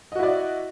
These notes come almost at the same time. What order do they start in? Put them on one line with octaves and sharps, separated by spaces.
D#5 F#4 E4 D5